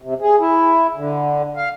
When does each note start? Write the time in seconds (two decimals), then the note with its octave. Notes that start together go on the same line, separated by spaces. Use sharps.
0.02 C3
0.21 G#4
0.40 E4
0.96 D3
1.57 F5